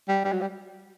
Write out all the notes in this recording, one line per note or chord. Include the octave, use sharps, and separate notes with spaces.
G3
G3
F#3
G3